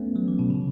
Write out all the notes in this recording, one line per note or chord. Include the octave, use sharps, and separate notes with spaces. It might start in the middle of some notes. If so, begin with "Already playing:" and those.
Already playing: A3 B3 C#4
F#3
E3
B2
C#3